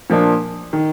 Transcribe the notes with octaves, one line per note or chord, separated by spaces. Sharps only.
A#2 F3 A#3 D4
D#3